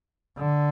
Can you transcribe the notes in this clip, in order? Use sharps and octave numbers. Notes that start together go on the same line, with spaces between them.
D3